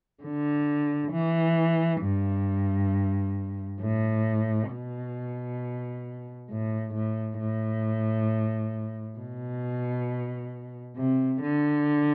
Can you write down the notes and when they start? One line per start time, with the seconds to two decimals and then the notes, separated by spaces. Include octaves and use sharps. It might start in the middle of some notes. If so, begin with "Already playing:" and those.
0.23 D3
1.12 E3
2.02 G2
3.81 A2
4.71 B2
6.50 A2
6.94 A2
7.39 A2
9.18 B2
10.97 C3
11.41 D3